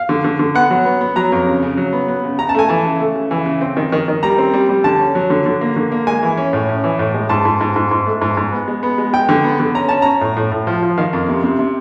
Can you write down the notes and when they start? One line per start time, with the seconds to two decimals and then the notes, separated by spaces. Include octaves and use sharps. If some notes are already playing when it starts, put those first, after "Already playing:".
Already playing: F5
0.09 D3
0.24 D3
0.39 D3
0.55 B3 F#5
0.71 F#3
0.85 B3
1.01 B3
1.16 F#3 A#5
1.32 F2
1.47 C#3
1.63 C#3
1.77 F#3
1.93 B3
2.08 B3
2.24 C#3
2.39 C#3 A#5
2.49 A5
2.55 A3 G#5
2.69 E3 A5
2.85 C#3
3.00 A3
3.15 C#3
3.31 E3
3.46 C#3
3.61 C4
3.77 D#3
3.92 D#3
4.08 D#3
4.23 G3 A#5
4.38 C4
4.53 G3
4.69 G3
4.84 D3 A5
5.00 C#4
5.15 F#3
5.30 D3
5.46 D3
5.61 A#3
5.76 D3
5.92 A#3
6.07 G#3 G#5
6.23 E3
6.37 C#4
6.53 A2
6.69 C#4
6.84 E3
6.99 A2
7.14 G#3
7.29 G#2 A5
7.45 G#2
7.61 G#2
7.76 G#2
7.91 G#2
8.06 A3
8.22 G#2
8.37 G#2
8.53 B3
8.68 G#3
8.83 B3
8.98 G#3
9.13 G#3 G5
9.29 D3
9.44 B3
9.60 D3
9.75 C#4 A#5
9.89 C#4 A5
10.02 C#4 A#5
10.21 A2
10.37 A2
10.52 A2
10.67 F3
10.82 F3
10.98 D#3 F5
11.13 F2
11.29 C3
11.44 C3
11.59 C3